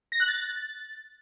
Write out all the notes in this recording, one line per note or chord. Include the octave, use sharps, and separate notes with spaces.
A#6
F#6
A6